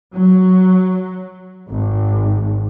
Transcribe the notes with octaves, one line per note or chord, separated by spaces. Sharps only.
F#3
G#1